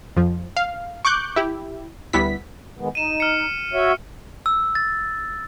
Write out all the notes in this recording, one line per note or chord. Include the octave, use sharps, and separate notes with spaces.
F2 F3
F5
C#6 D6 F#6 G6
E4 G4
D2 G3 B3 E4 B6
D#3 G#3 B3
D#4 D#7 E7
F6 C#7
F#4 C#5 E5
E6
A6